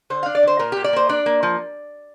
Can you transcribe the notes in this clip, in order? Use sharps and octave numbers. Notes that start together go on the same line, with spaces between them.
D3 C5
D4 F5
D5
D3 C5
A#2 A#4
A#2 G4
D5
A#3 C5
D4 D5
A#3
F3